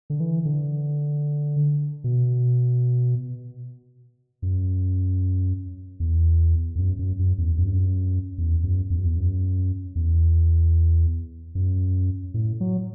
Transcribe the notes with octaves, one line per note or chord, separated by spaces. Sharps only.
D3
E3
D3
B2
F#2
E2
E2
F#2
F#2
F#2
E2
F#2
G2
F#2
E2
F#2
E2
F#2
E2
F#2
E2
F#2
A2
F#3